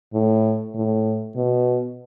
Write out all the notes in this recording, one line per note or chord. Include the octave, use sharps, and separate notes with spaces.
A2
A2
B2